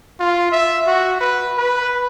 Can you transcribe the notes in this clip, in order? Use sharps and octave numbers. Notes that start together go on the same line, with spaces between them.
F4
E5
F#4
B4
B4